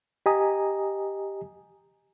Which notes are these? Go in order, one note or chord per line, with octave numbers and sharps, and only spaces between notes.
G4 D#5 G#5 A#5 D#6